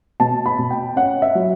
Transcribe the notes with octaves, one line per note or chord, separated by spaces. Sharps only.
B2 A5
B5
B2
G5
C#4 F#5
E5
F#3